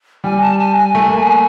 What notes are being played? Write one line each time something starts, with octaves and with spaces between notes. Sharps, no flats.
G3 G#5
A5
G#5
G#5
A3
A#3